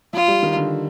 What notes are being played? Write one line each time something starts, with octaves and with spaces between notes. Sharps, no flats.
F3 F4
G3
D#3
D3